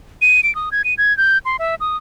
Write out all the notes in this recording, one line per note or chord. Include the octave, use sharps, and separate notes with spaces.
D#7
D7
D#6
G#6
D#7
G#6
G6
C6
E5
D#6